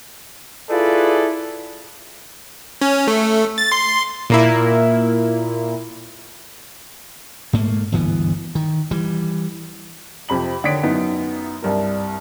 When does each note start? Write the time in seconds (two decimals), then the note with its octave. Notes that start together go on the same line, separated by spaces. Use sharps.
0.70 E4 F4 G#4 A4 B4 D5
2.81 C#4
3.08 A3
3.58 A6
3.72 C6
4.30 A#2 A#3 E4
7.53 G#2 A3 A#3
7.92 G1 D2 E3 B3
8.55 D#3
8.91 E3 G3
10.29 F2 C3 B5 F#7
10.64 D3 D#3 C#5 D#6 B6 D7
10.83 F#2 B3 D#4 E4
11.62 C2 G2 A#4